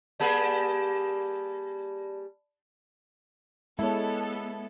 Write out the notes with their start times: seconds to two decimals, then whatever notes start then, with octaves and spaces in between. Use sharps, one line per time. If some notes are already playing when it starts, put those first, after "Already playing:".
0.20 G3 A#3 G#4 D5 A5 B5
3.79 G#3 B3 E4 A4 C#5